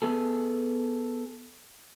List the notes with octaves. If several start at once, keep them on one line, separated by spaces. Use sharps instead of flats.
B3 G#4 A4